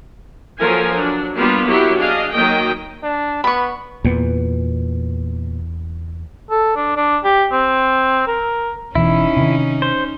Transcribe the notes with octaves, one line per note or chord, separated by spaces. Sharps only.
F3 F#3 A#3 A4 A#4 G#5
F#3 D4
G3 A#3 B3 D4 F4 G4
F#3 E4 G4 A#4
D4 G#4 D#5 F5
D#3 F#3 A#3 D#5 G5
D4
B3 B5 C#6
E2 A#2 B3
A4
D4
D4
G4
C4
A#4
E1 E2 C#4 D#4 E4
C3 D#3
C5